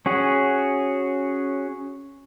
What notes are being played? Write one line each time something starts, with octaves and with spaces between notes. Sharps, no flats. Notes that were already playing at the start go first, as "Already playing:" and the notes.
C#4 F#4 G#4